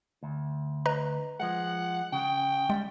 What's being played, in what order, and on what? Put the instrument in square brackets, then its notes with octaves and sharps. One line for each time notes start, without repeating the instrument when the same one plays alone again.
[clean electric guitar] D2
[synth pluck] B4 D#5 A#5
[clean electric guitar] F3 G#3 [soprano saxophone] F#5
[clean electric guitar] C#3 [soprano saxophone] G5
[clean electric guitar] G3 [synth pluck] G#3